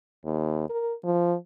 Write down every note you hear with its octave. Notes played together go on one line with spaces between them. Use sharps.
D#2
A#4
F3